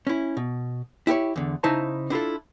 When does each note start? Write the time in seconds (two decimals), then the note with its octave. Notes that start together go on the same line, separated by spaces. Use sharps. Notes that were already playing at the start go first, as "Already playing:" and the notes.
0.07 C#4 E4
0.37 B2
1.07 E4 G4 A#4 C#5
1.36 E2 D3
1.63 C#3 D#4 E4 C5 A5 A#5
2.10 D4 E4 F4 A4